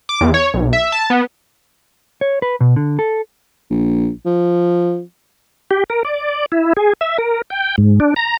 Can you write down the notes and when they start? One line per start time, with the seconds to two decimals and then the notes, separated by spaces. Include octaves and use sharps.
0.09 D6
0.21 E2
0.34 C#5
0.54 B1
0.73 E5
0.92 A5
1.10 B3
2.21 C#5
2.42 B4
2.61 B2
2.76 D3
2.99 A4
3.70 A#1
4.26 F3
5.71 G4
5.90 A#4
6.05 D5
6.52 E4
6.77 G#4
7.01 E5
7.18 A#4
7.50 G5
7.78 G#2
8.00 D4
8.16 A#5